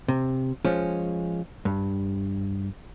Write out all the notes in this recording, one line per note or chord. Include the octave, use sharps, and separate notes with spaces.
C3
F3 G#3 C#4
G2